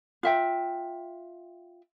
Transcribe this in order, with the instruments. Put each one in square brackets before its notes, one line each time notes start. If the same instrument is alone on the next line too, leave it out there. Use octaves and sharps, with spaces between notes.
[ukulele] F4 E5 G5